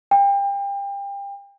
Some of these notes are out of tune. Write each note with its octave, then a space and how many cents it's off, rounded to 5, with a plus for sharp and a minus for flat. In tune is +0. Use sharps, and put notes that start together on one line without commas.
G5 +30